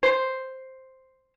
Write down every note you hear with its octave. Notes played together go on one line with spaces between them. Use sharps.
C5